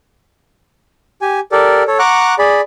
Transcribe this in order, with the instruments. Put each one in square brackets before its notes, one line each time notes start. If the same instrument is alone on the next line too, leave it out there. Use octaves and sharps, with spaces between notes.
[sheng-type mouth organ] G4 G#5
G4 A4 A#4 D5
A4 C#5
F#5 A#5 C#6 D6 F#6
G#4 D5 B5